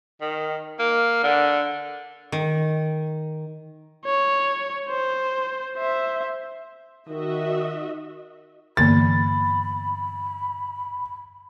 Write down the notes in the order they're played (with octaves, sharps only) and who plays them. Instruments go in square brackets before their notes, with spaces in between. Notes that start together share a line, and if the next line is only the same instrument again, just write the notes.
[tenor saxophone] D#3
A#3
D3
[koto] D#3
[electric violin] C#5
C5
C5 E5
[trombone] D#3 [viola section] F#4 D#5 E5
[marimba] G2 D3 E3 [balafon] A#3 B3 A#4 [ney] B5 [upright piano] A6